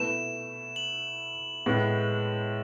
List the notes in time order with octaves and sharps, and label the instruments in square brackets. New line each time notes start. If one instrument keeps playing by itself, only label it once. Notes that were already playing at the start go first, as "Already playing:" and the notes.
Already playing: [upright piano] B2 A3 E4 B4 [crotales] E7
[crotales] F#7
[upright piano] A2 G#3 B3